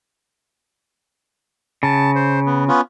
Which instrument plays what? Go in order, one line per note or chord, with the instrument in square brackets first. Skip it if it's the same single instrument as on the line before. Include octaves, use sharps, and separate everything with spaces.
[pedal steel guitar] C#3 [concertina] A5
[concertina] C5
B3
B3 C#4 F4